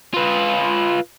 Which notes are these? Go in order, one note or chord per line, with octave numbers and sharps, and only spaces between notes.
F4 B4